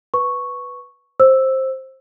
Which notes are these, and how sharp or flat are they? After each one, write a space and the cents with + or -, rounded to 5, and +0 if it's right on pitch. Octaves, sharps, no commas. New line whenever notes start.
B4 +0 C#6 +0
C5 +15 E6 +0